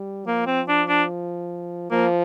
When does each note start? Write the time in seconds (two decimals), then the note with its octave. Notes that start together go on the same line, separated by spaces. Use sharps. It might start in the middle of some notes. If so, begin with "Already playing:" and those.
Already playing: G3
0.27 F3 A#3
0.47 C4
0.68 D4
0.89 D4
1.91 F3 A#3